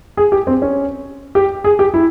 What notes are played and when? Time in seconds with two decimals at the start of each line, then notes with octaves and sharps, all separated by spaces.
0.17 G#4
0.32 G4
0.47 C4
0.62 C#4
1.35 G4
1.64 G#4
1.79 G4
1.94 E4